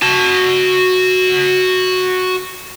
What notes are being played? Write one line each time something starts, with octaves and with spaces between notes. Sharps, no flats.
F#4 A5